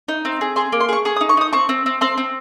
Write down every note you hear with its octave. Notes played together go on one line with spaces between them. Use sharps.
D#4
C4
G#4
G#4 C6
A#3
C6
G#4 C#6
G#4 C#6
D#6
D#4
C#6
D#4 D#6
C4 C#6
C4
C4
C4 C6
C4